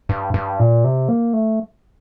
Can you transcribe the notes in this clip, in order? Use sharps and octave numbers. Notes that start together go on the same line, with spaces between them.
G2
G2
A#2
C3
A#3
A3